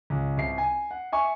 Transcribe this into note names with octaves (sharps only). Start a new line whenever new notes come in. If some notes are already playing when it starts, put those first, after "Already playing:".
C#2
C2 C7
G#5
F#5
E5 G#5 C#6